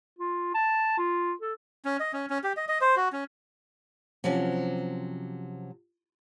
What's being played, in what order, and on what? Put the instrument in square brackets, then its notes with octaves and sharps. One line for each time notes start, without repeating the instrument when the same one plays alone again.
[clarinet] F4
A5
F4
A4
[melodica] C#4
D#5
C#4
C#4
G4
D#5
D#5
C5
F#4
C#4
[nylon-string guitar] C3 F3 F#3 C#4